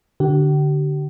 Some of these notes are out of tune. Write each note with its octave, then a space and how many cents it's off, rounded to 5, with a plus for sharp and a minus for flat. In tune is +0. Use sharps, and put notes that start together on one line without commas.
D3 +0 G4 -40